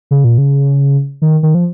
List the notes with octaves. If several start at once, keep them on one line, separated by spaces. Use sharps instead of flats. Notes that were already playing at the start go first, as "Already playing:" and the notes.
C#3
A#2
C#3
D#3
D#3
F3